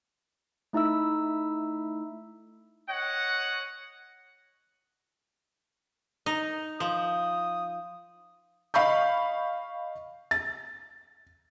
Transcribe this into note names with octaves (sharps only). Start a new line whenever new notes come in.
A3 D#4 E4 E5 E6
C#5 D#5 F#5
D#4
F3 D#6
D#5 F5 B5 C#6 G6
A6